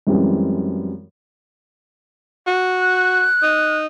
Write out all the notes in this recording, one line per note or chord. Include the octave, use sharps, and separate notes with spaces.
F#2 E3 G3 G#3 C4
F#4
F#6
D#4